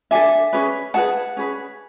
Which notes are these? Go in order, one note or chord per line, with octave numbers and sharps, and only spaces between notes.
D4 A4 E5 G#5
C#4 G#4 B4
E4 G#4 B4 F#5 A5
C#4 G#4 B4